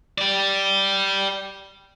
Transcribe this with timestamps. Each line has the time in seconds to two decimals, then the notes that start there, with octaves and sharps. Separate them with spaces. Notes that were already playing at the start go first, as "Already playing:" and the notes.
0.18 G4 D5